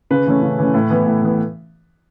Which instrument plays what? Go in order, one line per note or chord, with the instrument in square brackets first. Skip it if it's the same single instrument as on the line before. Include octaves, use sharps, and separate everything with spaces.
[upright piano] C#3 B4
E3 A3 C#4
C#3
E3 A3 C#4
A2
E3 B3
A2
E3 B3